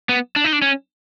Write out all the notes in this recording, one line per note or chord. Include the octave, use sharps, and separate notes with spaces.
B3
D4
D#4
D4
C#4